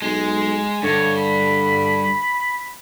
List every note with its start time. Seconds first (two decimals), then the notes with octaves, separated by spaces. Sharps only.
0.02 B1 G#3
0.83 G2 D3 C#5
1.17 B5